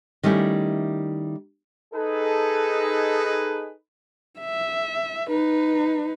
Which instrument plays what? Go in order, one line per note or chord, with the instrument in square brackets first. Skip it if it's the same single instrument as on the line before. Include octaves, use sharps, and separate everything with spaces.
[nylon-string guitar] D#3 G3 A3 C#4 E4
[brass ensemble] D#4 G#4 A4 B4
[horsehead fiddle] E5
D#4 B4